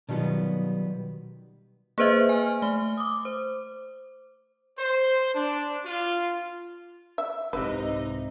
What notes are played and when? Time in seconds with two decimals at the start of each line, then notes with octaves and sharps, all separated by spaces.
0.09 B2 D#3 F#3 G3 B3 F4
1.98 A#3 G#4 B4 C5 D#5 E5
2.29 G#5 F6
2.62 A3 G7
2.97 D6 D#6
3.25 C5
4.79 C5
5.34 D4
5.85 F4
7.18 E5
7.53 C2 G#2 C3 D#4 B4 E5